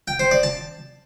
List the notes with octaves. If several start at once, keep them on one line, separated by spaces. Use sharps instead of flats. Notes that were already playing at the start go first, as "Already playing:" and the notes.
G5
C5
D5
A5